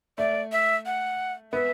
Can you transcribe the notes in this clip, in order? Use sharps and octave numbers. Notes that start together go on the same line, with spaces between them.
A3 D5
E5
F#5
B3 E5